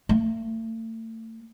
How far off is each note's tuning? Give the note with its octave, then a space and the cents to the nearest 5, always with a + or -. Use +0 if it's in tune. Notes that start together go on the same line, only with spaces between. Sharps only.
A3 +40